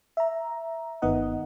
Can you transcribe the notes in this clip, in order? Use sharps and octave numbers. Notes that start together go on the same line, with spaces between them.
E5 A#5
G1 D#3 B3 D#4 D#5 F#5